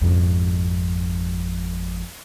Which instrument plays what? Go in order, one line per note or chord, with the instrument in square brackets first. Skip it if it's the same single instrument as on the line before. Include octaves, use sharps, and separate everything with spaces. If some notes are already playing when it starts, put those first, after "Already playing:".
[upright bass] G#1 F2